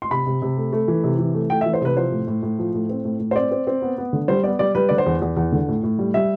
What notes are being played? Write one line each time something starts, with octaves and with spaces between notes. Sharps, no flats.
C6
C3 B5
C3
C3
A3
A3
E3
C3
E3
A3
A3 G5
E5
E3
C5
C3 B4
F3 C5
A2
A2
A2
F3
A2
C4
A2
A2
C5
C4 D5
C4
C4
B3
B3
D3
G3 C5
B3 D5
G3 D5
G3 B4
D3 D5
C5
E2
E2
E2
D3
A2
A2
G3
G3 E5